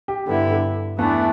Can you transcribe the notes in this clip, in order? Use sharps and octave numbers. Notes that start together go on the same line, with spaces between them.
G4
G2 D3 B3 E4
E2 E3 A3 B3 D4